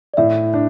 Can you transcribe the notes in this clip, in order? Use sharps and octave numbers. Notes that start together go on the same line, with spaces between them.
D5
A2 E5
D4